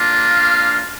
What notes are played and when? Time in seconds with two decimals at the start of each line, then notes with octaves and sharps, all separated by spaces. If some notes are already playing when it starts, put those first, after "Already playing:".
Already playing: A#3 D4 F4
0.28 F5